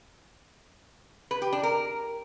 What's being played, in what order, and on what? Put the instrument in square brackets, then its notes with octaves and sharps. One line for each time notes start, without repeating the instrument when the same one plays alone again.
[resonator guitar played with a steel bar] B4
G4
D4
A#4